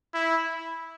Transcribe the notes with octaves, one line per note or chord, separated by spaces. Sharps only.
E4